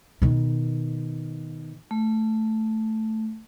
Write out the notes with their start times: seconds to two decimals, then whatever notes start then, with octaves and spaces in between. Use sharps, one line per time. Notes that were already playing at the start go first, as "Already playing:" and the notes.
0.22 B2 D#3
1.91 A3